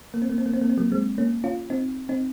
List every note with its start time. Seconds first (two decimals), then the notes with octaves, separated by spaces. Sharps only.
0.14 A#3
0.22 C4
0.30 A#3
0.38 C4
0.46 A#3
0.54 C4
0.61 A#3
0.70 C4
0.78 F#3 A#3
0.92 G#3 C4
1.18 A#3 C#4
1.44 C#4 F4
1.70 C4 D#4
2.09 C4 D#4